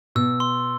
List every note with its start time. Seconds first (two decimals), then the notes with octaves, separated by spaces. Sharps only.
0.15 B2 E6
0.40 C6